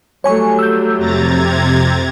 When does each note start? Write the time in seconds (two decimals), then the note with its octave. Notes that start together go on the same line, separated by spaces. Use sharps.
0.24 F#3 G3 A3 C#5 G#5 C#6
0.59 E6 G6
0.98 F2 C3 A#5 G#6 A6